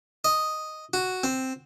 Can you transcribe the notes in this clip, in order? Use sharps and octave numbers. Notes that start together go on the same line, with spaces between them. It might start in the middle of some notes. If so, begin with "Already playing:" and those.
D#5
F#4
C4